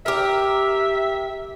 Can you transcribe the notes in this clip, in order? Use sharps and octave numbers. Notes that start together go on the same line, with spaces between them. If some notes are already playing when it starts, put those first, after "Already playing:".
G4 A#4 E5